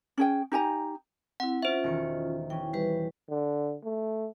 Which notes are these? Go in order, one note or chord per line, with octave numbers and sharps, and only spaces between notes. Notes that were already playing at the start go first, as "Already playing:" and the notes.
C#4 G#4 G5
D#4 G4 G#5 A#5
C4 E4 F#5
C#4 F4 C5 E5
E1 D#3 C#7
E3 C#4 G5
G3 G4 B4
D3
A3